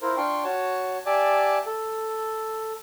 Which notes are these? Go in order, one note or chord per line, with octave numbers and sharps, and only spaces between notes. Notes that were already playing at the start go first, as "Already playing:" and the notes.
E4 F4 A#4 C5
D4 F4 G5 C6 C#6
F#4 C#5 A5
G4 D5 E5 G#5 A5 D6
A4